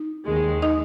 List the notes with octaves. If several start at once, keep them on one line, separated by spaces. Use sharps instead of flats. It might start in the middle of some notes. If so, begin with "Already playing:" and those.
Already playing: D#4
D#2 D#3 G#3
D#4 D#5